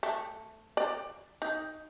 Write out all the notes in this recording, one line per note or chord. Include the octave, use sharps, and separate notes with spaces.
A3
D5
D#4